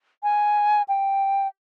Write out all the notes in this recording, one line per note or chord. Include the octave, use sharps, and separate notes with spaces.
G#5
G5